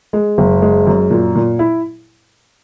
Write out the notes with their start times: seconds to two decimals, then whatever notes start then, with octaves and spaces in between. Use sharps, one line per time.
0.13 G#3
0.38 F#1
0.62 G#3
0.87 F#2
1.10 A#2
1.35 A#2
1.59 E4